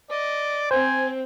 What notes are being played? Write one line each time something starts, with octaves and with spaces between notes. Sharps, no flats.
D5 D#5
C4 C5 G#5